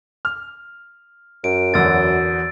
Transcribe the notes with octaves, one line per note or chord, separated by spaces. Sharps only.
F6
F#2 D7
E2 D3 F#3 E6 A6